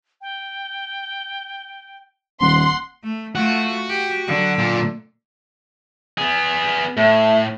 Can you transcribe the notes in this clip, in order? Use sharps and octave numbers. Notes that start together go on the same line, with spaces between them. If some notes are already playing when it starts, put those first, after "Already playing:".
G5
D#1 F#5 C6
A3
A3 F4 F#4
G4
D3 F#3
A#2
B3 G#4
A2 A3